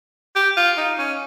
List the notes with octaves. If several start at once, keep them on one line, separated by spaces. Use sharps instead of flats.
G4
F4
D#4
C#4